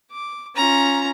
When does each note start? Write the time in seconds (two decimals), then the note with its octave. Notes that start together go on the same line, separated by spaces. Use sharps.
0.11 D6
0.56 C#4 F4 A#5